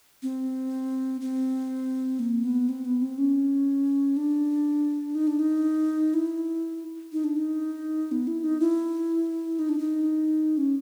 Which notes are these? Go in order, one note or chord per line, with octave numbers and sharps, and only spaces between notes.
C4
C4
A#3
B3
C4
B3
C4
C#4
D4
D#4
D4
D#4
E4
D#4
D4
D#4
B3
E4
D#4
E4
D#4
D4
D#4
C#4